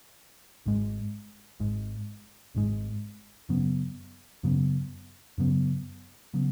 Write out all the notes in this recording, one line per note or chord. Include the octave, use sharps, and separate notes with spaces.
G#1 G#2 G#3
G#1 G#2 G#3
G#1 G#2 G#3
F#2 C#3 F#3 B3
F#2 C#3 F#3 B3
F#2 C#3 F#3 B3
C#3 F#3 B3